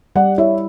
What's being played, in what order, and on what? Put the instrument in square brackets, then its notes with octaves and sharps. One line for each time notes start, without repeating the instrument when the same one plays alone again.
[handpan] G3 [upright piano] D5 F#5
[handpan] E4 [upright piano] C#5 E5